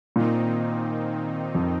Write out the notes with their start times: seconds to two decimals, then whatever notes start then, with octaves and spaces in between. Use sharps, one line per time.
0.16 A#2 D#3 C4 D#4
1.55 F2